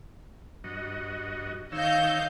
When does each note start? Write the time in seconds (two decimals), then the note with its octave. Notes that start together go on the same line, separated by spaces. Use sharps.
0.64 G2 F#4 D#5
1.72 D#3 C#5 D#5 F5 E6 G6